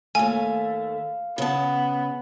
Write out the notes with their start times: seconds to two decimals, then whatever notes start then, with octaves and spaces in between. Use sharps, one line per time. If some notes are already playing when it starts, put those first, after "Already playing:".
0.15 D#2 A3 F5 G#5
1.38 C#3 B3 A5